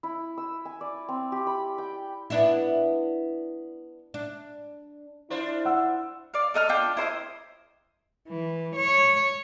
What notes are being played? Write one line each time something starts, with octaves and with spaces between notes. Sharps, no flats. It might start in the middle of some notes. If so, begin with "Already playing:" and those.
E4
E6
G#5
D5
C4
G4
B5
G5
B3 D4 E4
D4
D4 E4 F4 C5
F#5 E6
D5 F5
A4 D#5 E6 F6
D4 F4 G5
E4 C5 C#5 D#5
E3
C#5